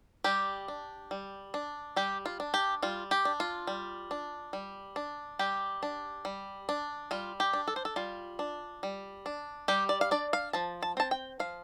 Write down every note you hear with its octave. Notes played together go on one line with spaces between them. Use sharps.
G3 G4
D4
G3
D4
G3 G4
F4
D4
G4
G3 F4
G4
D4
F4
G3
D4
G3
D4
G3 G4
D4
G3
D4
G3 F4
G4
D4
A4
C5
A4
G3 F4
D4
G3
D4
G3 G4
D5
F5
D4 D5
F5
F3 A5
A5
C4 A5
G5
F3 F5